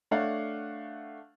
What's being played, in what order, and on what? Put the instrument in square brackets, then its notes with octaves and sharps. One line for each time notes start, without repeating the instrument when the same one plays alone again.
[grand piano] A3 D4 C#5 F5 F#5